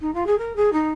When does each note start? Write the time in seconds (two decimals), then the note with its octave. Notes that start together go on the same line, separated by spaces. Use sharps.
0.01 D#4
0.14 F4
0.26 G#4
0.38 A#4
0.56 G#4
0.72 D#4